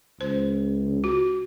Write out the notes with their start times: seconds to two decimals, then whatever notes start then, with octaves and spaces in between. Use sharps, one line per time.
0.21 C#2 C5
1.04 F#4